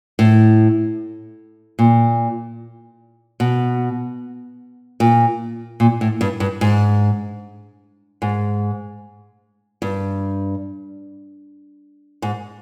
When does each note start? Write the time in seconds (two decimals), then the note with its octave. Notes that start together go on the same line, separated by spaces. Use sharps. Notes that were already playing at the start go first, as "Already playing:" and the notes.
0.19 A2
1.79 A#2
3.40 B2
5.00 A#2
5.80 A#2
6.01 A2
6.21 G2
6.40 G2
6.61 G#2
8.22 G#2
9.82 G2
12.22 G#2